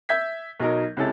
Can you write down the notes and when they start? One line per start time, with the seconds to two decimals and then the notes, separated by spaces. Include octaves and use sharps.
0.09 E5 G6 G#6 B6
0.60 B1 F#3 D#4 A#4
0.97 C#2 C3 C#4 E4 A4 A6